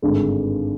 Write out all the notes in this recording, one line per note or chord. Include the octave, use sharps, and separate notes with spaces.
G#1 G2 D3 G#3